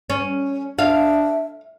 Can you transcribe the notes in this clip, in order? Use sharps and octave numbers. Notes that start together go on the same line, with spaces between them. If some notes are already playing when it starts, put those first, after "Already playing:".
C#4
D4 E5 F5